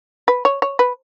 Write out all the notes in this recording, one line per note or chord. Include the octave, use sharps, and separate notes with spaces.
B4
C#5
C#5
B4